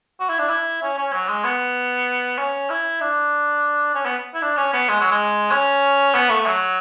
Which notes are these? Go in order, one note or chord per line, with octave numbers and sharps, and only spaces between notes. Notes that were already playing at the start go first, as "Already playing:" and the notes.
F#4
E4
D4
E4
C#4
C#4
F#3
G#3
B3
C#4
E4
D4
C#4
B3
E4
D4
C#4
B3
G#3
F#3
G#3
C#4
B3
A3
F#3